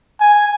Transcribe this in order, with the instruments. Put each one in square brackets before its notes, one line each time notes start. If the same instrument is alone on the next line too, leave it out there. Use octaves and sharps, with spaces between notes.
[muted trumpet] G#5